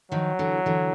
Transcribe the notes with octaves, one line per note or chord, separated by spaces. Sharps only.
D#3 F3 F#3
D3 E3
D3 E3